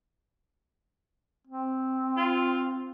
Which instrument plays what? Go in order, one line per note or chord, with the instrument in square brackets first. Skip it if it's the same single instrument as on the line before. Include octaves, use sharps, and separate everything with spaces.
[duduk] C4
[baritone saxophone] F4